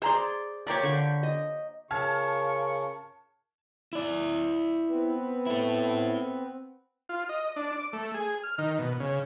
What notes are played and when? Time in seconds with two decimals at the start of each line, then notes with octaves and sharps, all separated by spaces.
0.02 G#4 C5 D5 A#5 C6
0.67 F3 A#3 G4 C#5 D5
0.83 D3 G5 C#6
1.23 D#5
1.91 C#3 F4 A#4 A5 C#6 F6 G#6
3.93 E4 D5
4.90 B3 C4 B4
5.47 E4 A4
7.09 F4
7.29 D#5
7.56 D4
7.73 D6
7.93 A3
8.14 G#4
8.43 F6
8.58 D#3
8.79 B2
9.00 C#3